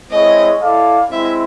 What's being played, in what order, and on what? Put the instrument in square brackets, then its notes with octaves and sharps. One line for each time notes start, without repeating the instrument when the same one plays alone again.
[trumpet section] G#3 C4 E4 G#4 C#5 [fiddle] D#5
[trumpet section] E4 A4 D5 F5
[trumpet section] G#3 C4 E4 [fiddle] E5